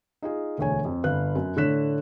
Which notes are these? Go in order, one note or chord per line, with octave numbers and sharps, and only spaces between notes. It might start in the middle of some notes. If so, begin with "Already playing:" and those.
D#4 F4 G#4
E1 D2 C#5 G#5
F2
G1 B4 F5 F#6
F#2
A2 D3 C#5 F#6 B6 E7